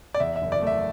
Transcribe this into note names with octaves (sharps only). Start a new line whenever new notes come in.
D5
E2 E5
E5
F#1
D5
A3 E5